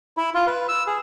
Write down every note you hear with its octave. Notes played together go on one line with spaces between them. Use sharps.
E4
F4
B4
E6
G#4